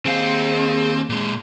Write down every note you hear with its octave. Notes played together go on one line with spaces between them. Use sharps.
D#2 C4 G#4 F5
A#2 G#3